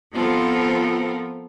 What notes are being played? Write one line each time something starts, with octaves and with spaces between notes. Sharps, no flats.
F3 B3 C4 F4 A4 A#4